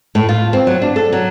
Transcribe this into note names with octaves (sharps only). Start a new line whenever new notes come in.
A2
F4
C4
F#3
D4
A4
F#3